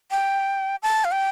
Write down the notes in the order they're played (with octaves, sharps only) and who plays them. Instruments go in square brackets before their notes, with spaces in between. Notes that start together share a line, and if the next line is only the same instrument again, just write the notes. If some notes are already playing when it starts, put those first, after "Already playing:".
[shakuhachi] G5
A5
F5
G5